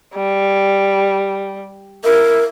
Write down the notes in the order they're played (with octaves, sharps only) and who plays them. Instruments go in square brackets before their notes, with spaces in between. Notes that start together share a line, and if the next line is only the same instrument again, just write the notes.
[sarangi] G3
[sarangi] E4 [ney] A#4